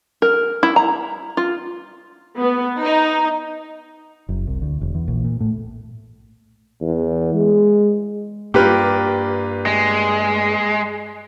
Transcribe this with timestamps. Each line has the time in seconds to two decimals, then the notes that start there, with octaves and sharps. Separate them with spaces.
0.22 A#4
0.63 E4
0.76 A#5
1.37 F4
2.40 B3
2.80 D#4
4.29 F#1
4.47 C2
4.62 D2
4.81 E1
4.95 E2
5.08 A#1
5.25 A#2
5.40 A2
6.81 E2
7.34 G#3
8.54 G2 A#3 F4 G4 B4
9.66 G#3